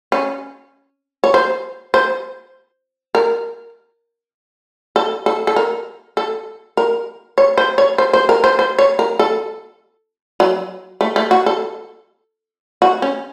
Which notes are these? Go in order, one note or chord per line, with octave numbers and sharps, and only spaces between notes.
C#4
C#5
C5
C5
A#4
A4
A4
A4
A#4
A4
A#4
C#5
C5
C#5
C5
C5
A#4
C5
C5
C#5
A#4
A4
F#3
A3
A3
F#4
A4
F#4
C#4